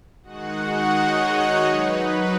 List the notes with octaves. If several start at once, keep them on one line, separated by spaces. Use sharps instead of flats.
D#3 G#3 D#4 F#4 F#5
D#4 D#5
C#5
F#3 D#4 B4
B4